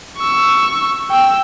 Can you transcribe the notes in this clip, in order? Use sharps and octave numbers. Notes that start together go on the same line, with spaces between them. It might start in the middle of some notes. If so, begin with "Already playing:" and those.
C#6 E6
G5 E6